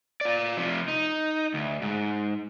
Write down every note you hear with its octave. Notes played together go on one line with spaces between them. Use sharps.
F4 D5
C3 F3
D#4
D2
G#2